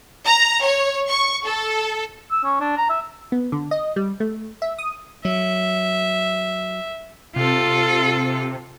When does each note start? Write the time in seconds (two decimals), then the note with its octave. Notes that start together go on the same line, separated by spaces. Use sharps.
0.25 A#5
0.61 C#5
1.08 C#6
1.44 A4
2.31 E6
2.44 C#4
2.60 D4
2.77 A#5
2.90 E5
3.32 B3
3.52 D3
3.71 D#5
3.96 G3
4.20 A3
4.62 E5
4.78 D#6
5.25 F#3 E5
7.36 C3 F4 A4